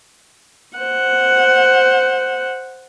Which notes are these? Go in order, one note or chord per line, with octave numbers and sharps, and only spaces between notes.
C5 F#5